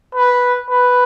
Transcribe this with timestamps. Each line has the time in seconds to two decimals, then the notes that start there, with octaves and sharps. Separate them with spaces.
0.15 B4
0.70 B4